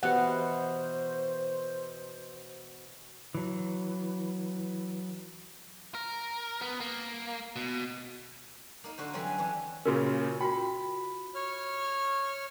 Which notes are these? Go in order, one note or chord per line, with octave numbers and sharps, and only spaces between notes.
B2 E3 B3 G4 C5 F#5
E3 F#3
A#4
B3
A#3
B2
A#3 D#4
D3 F#4 C5
D3 E3 F#3 G3 C4 C#4
G#5
E3 D4 C#5
A#2 C#3 C#4 F#4 A#4
F4 F#4 G5 B5
C#5 F6